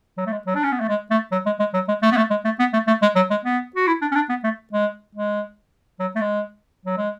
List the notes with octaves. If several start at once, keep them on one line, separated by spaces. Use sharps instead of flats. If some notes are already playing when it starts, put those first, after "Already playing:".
F#3
A3
G#3
F#3
D4
C#4
B3
A3
G#3
A3
F#3
G#3
G#3
F#3
G#3
A3
B3
A3
G#3
A3
B3
A3
A3
G#3
F#3
G#3
B3
F#4
E4
D4
C#4
D4
B3
A3
G#3
G#3
F#3
A3
G#3
F#3
G#3